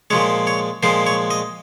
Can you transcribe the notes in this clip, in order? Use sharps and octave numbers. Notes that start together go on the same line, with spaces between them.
A#2 F3 G#3 C#5
C#5
A#2 F3 G#3 C5
C#5
D#5